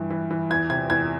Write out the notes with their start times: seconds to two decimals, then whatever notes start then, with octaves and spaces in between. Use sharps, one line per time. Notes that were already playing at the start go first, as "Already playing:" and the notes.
Already playing: G2 E3
0.10 E3
0.31 E3
0.50 E2 G#6
0.70 C3 G#6
0.90 E2 G#6